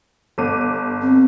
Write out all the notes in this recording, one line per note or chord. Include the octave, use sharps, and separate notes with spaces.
G1 D6 D#7
C4